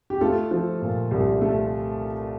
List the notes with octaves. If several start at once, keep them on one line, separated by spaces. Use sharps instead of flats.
G4
A3 F4 A4
F3
A#2
C2
A3